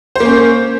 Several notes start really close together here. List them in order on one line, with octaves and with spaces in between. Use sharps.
C5 A#3 C#4